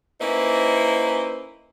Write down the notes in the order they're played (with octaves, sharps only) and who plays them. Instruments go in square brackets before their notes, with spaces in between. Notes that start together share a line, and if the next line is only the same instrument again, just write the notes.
[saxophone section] A#3 C#4 D#4 E4 B4 C5